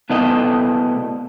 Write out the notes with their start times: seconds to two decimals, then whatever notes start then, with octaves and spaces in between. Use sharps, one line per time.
0.09 B2 A3 B3 E4 A4 D#5